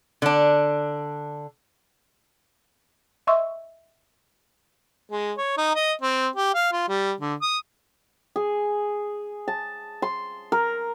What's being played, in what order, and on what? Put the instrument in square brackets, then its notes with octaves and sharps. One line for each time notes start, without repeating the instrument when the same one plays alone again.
[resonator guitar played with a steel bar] D3 D4
[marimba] D#5 E5 C6 C#6 E6
[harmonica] G#3
C#5
D#4
D#5
C4
G4
F5
F4
G3
D3
D#6
[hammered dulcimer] G#4
A5
C6
A#4